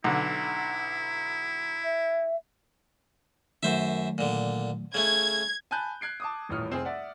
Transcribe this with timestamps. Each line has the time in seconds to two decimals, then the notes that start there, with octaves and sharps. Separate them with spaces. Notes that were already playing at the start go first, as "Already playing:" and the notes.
0.04 B1 D3 E4
1.84 E5
3.63 F#2 D#3 F#3 A3 C5 E5
4.18 A#2 D3
4.94 C#3 A3 G#6
5.71 G#5 A5 B5 F#6 G6
6.01 F#6 G#6 C7 D7
6.20 A5 D6 D#6
6.49 D#1 A1 A2 C#5 D#6 F6
6.70 F1 C4 G#4
6.85 D5 E5 F#5